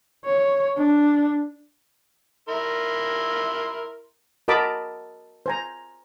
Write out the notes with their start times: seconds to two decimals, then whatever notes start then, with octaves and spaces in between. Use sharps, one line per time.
0.25 C#5
0.77 D4
2.49 E4 A#4 C6
4.48 F#4 A#4 D#5 A5 B5 D6
5.46 C5 G#5 A#5